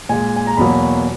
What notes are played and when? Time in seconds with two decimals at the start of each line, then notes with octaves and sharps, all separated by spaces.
0.09 A#2 G#3 G#5
0.36 G#5
0.47 A#5
0.57 E2 B2 F#3 A#3 B5